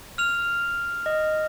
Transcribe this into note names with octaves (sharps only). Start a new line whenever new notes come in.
F6 F7
D#5